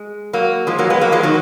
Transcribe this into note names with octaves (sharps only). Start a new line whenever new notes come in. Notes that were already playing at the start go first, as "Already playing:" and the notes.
Already playing: G#3
F#3 A#3
F3 G#3
F#3 A#3
G#3 B3
F#3 A#3
F3 G#3
D#3 F#3